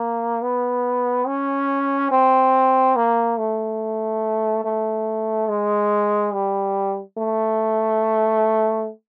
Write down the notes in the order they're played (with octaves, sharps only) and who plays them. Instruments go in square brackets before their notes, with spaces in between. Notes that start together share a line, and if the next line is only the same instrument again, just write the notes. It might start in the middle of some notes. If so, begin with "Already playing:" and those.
Already playing: [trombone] A#3
B3
C#4
C4
A#3
A3
A3
G#3
G3
A3